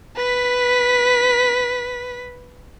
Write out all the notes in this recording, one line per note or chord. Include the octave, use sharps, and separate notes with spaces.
B4 B6